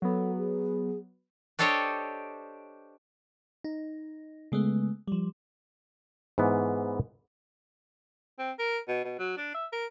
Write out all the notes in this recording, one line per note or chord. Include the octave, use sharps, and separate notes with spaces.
F#3 B3 A4
G#4
D4 G4 A4 C5 C#5 D#5
D#4
C#3 G#3 A3 B3
F3 G3
G#2 E3 B3
C4
A#4
B2
B2
F#3
D4
E5
A#4